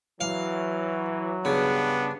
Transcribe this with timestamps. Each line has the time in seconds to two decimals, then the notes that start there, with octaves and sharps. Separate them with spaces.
0.21 E3 F#3 F5
1.45 G2 C#3 B3 D4